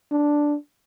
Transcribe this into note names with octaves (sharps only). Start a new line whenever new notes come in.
D4